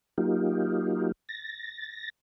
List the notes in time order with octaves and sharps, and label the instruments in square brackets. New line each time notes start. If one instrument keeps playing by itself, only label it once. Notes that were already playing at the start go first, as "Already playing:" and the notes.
[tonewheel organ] F#3 A#3 D#4 F4 G4
A6 A#6